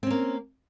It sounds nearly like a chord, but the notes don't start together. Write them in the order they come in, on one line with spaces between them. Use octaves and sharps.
C4 C#4 A#3